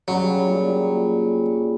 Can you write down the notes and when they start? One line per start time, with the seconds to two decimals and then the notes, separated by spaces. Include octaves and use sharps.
0.08 C#3 F#3 G3
0.48 A#2